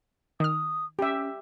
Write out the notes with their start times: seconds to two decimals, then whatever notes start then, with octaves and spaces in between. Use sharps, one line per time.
0.40 D#3 D#6 F6
0.99 C#4 G4 E5